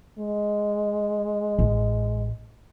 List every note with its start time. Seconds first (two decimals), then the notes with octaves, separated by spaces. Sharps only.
0.19 G#3
1.59 A1